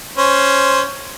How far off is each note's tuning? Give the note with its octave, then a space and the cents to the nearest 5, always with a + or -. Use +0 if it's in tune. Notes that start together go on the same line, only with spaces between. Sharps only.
C#4 +0 C5 +0